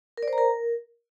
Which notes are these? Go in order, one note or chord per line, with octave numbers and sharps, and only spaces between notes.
A#4
D5
C5
A#5
A#4